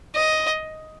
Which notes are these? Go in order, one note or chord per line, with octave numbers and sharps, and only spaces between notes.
D#5